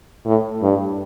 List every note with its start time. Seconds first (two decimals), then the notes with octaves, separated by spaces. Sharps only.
0.26 A2
0.63 G2